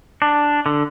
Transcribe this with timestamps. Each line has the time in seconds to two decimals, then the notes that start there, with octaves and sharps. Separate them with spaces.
0.22 D4
0.66 D3